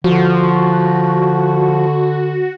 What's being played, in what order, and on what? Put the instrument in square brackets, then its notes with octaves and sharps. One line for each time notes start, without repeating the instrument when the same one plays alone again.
[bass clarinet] D3 [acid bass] F3 [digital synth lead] F#4